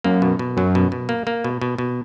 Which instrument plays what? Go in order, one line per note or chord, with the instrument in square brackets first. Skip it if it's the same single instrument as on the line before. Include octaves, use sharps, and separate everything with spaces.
[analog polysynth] F#2 [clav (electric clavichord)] A#3
[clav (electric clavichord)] B2
B2
[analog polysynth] F#2 [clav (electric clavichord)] F#3
[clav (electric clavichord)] B2
B2
A#3
A#3
B2
B2
B2